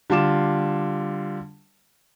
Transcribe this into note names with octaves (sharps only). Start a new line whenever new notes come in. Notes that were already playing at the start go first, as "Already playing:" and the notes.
D3 G3 F4 D6 E7